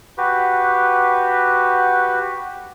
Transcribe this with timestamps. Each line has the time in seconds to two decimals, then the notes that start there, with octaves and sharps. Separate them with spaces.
0.18 F#4 G4 B4